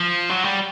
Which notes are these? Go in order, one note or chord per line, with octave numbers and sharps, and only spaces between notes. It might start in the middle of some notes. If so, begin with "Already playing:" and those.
Already playing: F3
F#3
G3